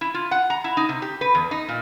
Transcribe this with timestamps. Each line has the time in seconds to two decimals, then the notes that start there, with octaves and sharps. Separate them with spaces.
0.01 E4
0.14 F4
0.31 F#5
0.50 A#5
0.64 E4
0.77 D#4
0.89 C3
1.02 G4
1.21 B4
1.35 E2
1.51 D#4
1.69 A#2